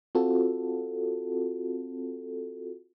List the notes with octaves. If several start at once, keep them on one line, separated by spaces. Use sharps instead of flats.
C4 F4 F#4 A4